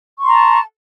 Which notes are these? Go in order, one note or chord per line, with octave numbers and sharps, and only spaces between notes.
A5 A#5 C6 C#6